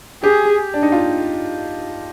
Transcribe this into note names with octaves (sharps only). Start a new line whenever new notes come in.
G4 G#4
D4
D#4
F4